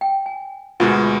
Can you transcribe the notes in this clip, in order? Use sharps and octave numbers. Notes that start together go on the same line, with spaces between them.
G5
G#5
D2 B2 G#3 F4 A#4 F#5